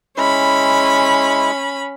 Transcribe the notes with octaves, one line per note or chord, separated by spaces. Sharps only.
G#3 C#4 E4 B5